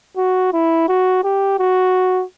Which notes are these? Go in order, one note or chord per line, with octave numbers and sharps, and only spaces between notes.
F#4
E4
F#4
G4
F#4